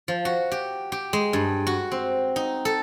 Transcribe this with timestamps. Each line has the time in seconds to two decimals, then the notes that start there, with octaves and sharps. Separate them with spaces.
0.08 F3
0.25 F#4
0.51 G4
0.92 G4
1.13 G#3
1.33 G2
1.67 F#4
1.92 C4
2.36 D#4
2.65 A4